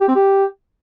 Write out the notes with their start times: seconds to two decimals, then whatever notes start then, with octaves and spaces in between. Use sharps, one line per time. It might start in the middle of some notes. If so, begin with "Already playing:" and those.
0.01 G4
0.08 C4
0.15 G4